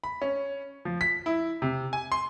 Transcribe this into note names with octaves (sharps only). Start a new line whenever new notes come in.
B5
C#4
F3
B6
E4
C3
G#5
C6